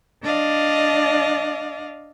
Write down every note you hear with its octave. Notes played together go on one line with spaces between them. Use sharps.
D4 D5 D#5 F5